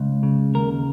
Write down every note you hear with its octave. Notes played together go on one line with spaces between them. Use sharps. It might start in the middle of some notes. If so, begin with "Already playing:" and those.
Already playing: C#2
C#3
D#2 A#4